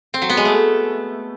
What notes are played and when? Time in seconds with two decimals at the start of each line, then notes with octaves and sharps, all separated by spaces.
0.14 C4
0.22 F#3
0.29 B3
0.37 G#3
0.45 A3